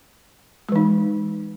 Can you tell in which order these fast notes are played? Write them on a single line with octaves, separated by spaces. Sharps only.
G#3 E3 D#4